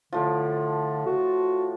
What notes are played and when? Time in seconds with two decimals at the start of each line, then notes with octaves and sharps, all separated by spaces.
0.13 A2 D3 F3
1.06 F#4